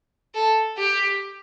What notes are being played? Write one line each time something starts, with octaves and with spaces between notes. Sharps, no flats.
A4
G4